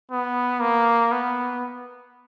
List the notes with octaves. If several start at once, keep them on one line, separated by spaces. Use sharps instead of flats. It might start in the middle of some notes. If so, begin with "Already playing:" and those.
B3
A#3
B3